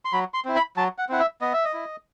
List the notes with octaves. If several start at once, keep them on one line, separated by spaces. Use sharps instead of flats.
C6
F#3 B5
C6
C4 E4
B5
F#3 A5
F#5
C4 E4 F#5
E5
B3 D#5
E5
D#5
E4